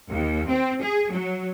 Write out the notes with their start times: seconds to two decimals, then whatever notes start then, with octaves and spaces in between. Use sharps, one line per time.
0.11 D#2
0.48 C4
0.83 G#4
1.11 F#3